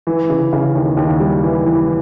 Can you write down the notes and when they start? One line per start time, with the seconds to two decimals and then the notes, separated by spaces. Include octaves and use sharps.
0.07 E3
0.30 C#3
0.53 C#3
0.75 D#2
0.97 D#2
1.20 G3
1.43 E3
1.65 E3